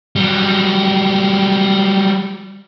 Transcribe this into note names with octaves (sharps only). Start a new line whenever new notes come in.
F#3 G3